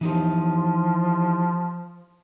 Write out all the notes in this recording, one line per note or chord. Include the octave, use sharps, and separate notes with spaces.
E3 F3 D#4 G4